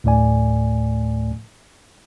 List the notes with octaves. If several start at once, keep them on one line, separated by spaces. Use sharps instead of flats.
D2 A2 A3 D5 G#5